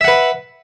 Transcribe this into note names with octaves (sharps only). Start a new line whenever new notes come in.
B4 E5 F#5